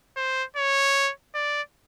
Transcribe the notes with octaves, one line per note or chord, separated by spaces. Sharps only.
C5
C#5
D5